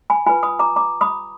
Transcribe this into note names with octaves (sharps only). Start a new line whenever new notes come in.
G#5 B5
F4 B4 G#5 B5
B5 D#6
A#5 D6
A#5 D6
B5 D#6